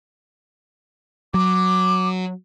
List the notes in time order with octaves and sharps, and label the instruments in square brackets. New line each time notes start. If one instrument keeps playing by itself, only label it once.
[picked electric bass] F#3 [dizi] D6